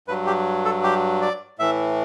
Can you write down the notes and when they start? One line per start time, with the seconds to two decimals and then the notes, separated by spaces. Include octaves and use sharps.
0.08 G2 F#3 B4
0.27 G4
0.65 A4
0.83 G4
1.22 D5
1.59 A2 E3 E5